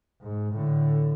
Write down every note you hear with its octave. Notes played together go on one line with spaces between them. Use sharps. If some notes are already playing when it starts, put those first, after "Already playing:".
G#2
A2 D3